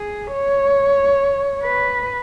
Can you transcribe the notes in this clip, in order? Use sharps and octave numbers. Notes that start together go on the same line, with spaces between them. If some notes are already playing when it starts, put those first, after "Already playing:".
Already playing: G#4
C#5
B4